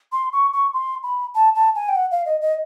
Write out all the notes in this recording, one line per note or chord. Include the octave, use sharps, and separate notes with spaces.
C6
C#6
C#6
C6
B5
A5
A5
G#5
G5
F#5
F5
D#5
D#5